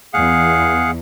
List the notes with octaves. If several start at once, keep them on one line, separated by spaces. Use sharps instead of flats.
E2 G#4 F5 F#5